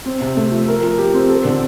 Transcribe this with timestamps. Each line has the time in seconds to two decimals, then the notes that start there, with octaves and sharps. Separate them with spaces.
0.06 C4
0.21 C3
0.37 A3
0.52 F3
0.68 A#4
0.83 F3
0.98 G4
1.14 C4
1.30 A4
1.45 D3